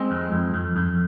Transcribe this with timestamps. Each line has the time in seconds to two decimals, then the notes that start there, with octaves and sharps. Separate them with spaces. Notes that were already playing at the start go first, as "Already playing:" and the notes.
Already playing: G#3 C4
0.11 F2
0.32 F2
0.54 F2
0.76 F2